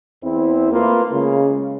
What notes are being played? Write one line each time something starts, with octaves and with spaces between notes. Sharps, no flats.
E2 C4 E4
A3 A#3 F4 B4
C#3 G#3